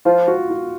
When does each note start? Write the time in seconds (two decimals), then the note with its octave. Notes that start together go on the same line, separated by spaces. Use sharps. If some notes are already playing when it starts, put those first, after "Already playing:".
0.05 F3 F4
0.28 F#4
0.50 F4